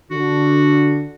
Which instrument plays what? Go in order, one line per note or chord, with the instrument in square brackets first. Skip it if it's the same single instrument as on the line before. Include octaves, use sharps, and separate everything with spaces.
[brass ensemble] D3 [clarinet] F#4